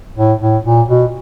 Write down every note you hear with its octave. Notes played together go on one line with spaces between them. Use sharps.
A2
A2
A#2
B2